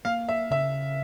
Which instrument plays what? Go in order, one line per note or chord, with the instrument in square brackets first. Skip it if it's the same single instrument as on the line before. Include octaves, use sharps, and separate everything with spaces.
[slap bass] A#3 [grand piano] F5
[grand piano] E5
[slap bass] C#3 [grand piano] E5